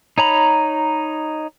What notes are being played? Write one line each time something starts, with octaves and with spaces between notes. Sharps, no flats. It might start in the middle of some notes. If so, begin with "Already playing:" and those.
D#4 C#5 A#5 B5